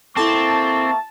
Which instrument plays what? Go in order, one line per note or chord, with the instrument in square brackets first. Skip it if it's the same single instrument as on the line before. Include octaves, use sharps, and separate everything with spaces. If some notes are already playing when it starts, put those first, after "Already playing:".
[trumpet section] A#3 E5 C#6 [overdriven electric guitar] C4 [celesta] E4 A4 D6 [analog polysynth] A5